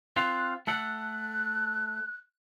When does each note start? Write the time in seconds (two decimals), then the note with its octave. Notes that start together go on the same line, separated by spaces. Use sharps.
0.16 C4 F4 F5 F#6
0.67 A3 A4 F#5 F#6